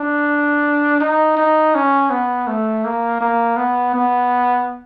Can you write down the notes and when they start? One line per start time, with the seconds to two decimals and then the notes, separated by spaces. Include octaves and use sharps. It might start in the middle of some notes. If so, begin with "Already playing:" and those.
Already playing: D4
1.00 D#4
1.37 D#4
1.75 C#4
2.10 B3
2.47 A3
2.84 A#3
3.21 A#3
3.57 B3
3.94 B3